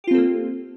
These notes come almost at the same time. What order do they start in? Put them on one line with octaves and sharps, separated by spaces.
G4 F4 C4 A4 A#3